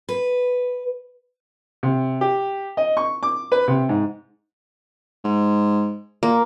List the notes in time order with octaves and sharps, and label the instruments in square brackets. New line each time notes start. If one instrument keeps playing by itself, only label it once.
[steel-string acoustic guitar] B4
[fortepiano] C3
G4
D#5
C#6
D6
B4
C3
G#2
[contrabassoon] G#2
[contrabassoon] A#2 [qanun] A#3